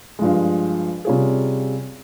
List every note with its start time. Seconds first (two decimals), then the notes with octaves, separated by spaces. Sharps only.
0.19 G2 F3 G#3
1.05 C3 G3 C#4 F4 G#4